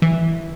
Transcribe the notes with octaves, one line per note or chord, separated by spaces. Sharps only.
E3